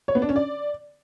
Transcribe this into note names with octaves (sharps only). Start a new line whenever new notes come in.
C#5
B3
D4
C#4
D5